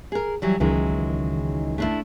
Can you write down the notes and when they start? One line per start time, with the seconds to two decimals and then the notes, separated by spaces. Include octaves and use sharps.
0.12 G#4 A#4
0.42 E3 F#3 G3
0.60 C#2 D#3 E3 F#3 G#3
1.78 A3 D4 E4